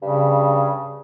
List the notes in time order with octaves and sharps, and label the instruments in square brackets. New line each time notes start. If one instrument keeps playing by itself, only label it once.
[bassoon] G2 [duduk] C#3